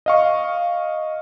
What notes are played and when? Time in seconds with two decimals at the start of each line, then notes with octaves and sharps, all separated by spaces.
0.06 D#5 F5 C#6